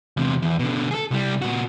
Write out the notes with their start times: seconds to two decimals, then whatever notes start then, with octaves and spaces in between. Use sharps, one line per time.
0.17 E2 C3
0.42 E2
0.59 B2 D3
0.91 G#4 A4
1.11 C2 G3
1.42 A#2 F#4